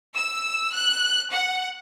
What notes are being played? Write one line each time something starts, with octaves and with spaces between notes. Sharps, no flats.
E6
F#6
F#5